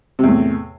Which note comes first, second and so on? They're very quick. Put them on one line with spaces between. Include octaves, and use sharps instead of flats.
C3 E2 A2